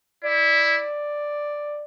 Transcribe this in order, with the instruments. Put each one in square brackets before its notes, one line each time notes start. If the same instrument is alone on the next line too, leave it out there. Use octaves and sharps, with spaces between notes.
[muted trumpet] E4 [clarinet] D5